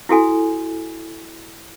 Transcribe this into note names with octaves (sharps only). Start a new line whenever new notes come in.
E4 F#4 A4 G#5